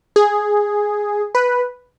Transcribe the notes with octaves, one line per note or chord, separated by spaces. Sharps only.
G#4
B4